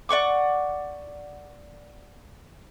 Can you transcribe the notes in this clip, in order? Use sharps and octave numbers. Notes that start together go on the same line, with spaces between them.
D5 F#5 C#6 D6